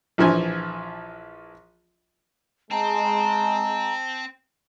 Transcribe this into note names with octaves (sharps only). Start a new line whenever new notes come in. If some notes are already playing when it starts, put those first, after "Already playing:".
A#1 E3 F3 G#5
G#3 C4 A5 A#5